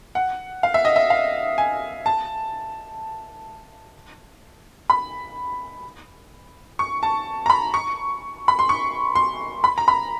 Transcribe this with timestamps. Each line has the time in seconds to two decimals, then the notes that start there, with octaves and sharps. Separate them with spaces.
0.15 F#5
0.63 F5
0.74 E5
0.85 D#5
0.96 E5
1.10 F5
1.58 G#5
2.06 A5
4.90 B5
6.79 C#6
7.03 A5
7.46 A#5
7.50 B5
7.74 C#6
8.48 B5
8.59 C6
8.69 C#6
9.15 C6
9.64 B5
9.78 A#5
9.88 B5